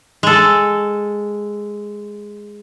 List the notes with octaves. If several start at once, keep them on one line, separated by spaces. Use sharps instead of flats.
G#3 A4